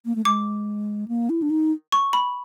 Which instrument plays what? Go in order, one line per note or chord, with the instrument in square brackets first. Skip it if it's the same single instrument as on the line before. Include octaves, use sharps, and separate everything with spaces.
[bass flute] A#3
A3
[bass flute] G#3 [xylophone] D6
[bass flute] A#3
E4
D4
D#4
[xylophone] C#6
B5